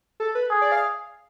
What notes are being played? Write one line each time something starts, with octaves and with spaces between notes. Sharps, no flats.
A4
B4
G#4
D5
F5